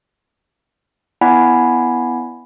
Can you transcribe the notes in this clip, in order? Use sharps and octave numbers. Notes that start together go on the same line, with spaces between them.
B3 E4 D5 F#5 G#5 B5